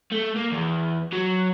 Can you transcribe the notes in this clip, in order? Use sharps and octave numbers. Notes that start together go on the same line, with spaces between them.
A3
A#3
E2
F#3